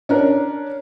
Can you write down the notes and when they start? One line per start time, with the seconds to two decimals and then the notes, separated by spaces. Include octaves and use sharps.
0.09 C#4 D4 A#4